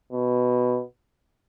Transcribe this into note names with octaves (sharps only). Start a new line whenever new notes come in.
B2